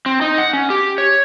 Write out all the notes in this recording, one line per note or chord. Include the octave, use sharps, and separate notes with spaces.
C4
D#4
F#5
C#4
G4
C#5